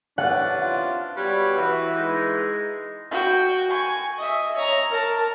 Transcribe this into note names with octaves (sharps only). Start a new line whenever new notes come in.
C3 E3 C#4 D4 F#5
F4
B2 G3 B4 C#5
E3 F#4
G#3 D#4
F#4 G5
G#5 C#6
D#5 E5
C#5 A#5
A#4 A5